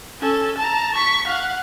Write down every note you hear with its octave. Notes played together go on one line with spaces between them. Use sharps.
C#4 A4
A5 A#5
C#6 B6
F5 F#5